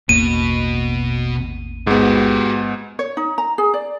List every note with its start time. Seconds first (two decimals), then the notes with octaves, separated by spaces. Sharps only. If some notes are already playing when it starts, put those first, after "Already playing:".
0.09 A1 E2 B2 A#3 D#7
1.87 G#2 B3 F#4 G4
2.99 C#5
3.17 D#4
3.38 A#5
3.58 G#4
3.74 D5